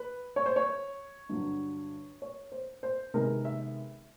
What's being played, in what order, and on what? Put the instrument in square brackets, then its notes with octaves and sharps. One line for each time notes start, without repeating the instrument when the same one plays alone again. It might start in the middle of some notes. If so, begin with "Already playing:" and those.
Already playing: [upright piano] B4
C#5
C5
C#5
G2 D3 F#3
C#5
C5
C5
C3 D#3 G#3 B3 A#4
E5